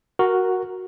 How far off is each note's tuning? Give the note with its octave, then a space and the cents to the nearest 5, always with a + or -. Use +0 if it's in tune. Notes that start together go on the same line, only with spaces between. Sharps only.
F#4 +0 A#4 +0